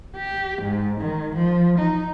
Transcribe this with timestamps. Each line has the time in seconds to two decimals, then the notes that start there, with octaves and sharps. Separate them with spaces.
0.17 G4
0.62 G#2
1.01 D#3
1.36 F3
1.79 D#4